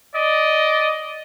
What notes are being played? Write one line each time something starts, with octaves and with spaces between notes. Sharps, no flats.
D5 D#5